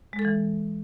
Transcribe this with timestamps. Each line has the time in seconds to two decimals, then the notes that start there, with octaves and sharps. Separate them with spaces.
0.13 G#3
0.19 A4
0.25 E3